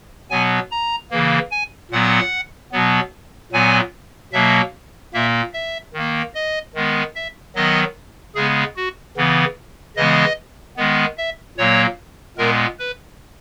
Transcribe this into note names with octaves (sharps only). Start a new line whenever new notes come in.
B2 F#3 B3 G#5
A#5
C#3 E3 A#3
G#5
A#2 F#3 B3 F#5
B2 F#3 B3
A#2 F#3 B3 G#5
B2 F#3 A#3 E5
A#2 A#3 E5
E5
D#3 A#3
D#5
D#3 G#3 B3
E5
D#3 F#3 B3 D#5
C#3 G#3 B3 G#4
F#4
C#3 E3 B3
C#3 E3 G#3 B3 D#5
D#3 G#3 B3
E5
A#2 F#3 A#3 C#5
A#2 G#3 B3 A#4
B4